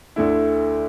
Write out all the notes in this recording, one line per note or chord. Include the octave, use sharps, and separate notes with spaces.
D2 D3 A3 E4